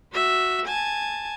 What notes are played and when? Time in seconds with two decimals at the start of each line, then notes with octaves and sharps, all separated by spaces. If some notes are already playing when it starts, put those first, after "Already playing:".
0.12 F#4 E5
0.66 G#5 A5